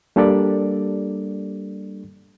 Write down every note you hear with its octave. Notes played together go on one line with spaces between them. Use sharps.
G3 A#3 D4 G4 A4 D5